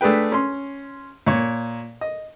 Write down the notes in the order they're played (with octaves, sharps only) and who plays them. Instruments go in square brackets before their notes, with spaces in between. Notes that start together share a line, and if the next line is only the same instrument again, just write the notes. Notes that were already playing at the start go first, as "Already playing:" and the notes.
[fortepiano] A3 D4 G#4 B4 G5
C#4 C6
A#2 C#5
D#5